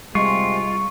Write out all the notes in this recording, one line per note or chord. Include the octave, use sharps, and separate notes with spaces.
C3 G3 G#3 F4 C#6